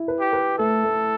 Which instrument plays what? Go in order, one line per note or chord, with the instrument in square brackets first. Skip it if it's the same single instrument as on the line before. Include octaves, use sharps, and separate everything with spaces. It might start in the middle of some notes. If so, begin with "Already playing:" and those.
Already playing: [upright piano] E4
B4
[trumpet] G4
[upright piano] B4
[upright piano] A3 [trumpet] A4
[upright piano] A3